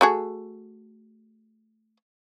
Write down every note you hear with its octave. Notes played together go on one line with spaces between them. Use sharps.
A3 F#4 G#4